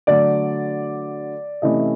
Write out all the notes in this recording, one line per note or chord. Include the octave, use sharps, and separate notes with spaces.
D3 F#3 A3 D5
C3 E3 A3 C#4 E4 D#5